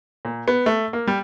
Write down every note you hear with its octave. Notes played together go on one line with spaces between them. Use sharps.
A#2
B3
A3
A#3
G3